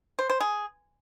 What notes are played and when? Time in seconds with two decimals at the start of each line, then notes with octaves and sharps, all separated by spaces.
0.19 C5
0.30 C5
0.40 G#4